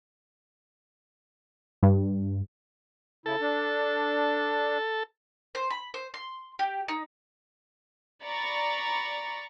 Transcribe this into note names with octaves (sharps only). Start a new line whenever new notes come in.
G2
C#3 E4 A4
D4
C5
B5
C5
C6
G4
D#4
D5 A#5 B5 C#6 A6